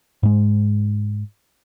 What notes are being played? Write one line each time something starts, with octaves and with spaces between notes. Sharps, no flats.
G#2 G#3